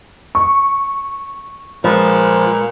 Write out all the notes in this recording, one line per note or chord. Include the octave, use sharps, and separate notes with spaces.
C#6
A#2 F3 G#3 B4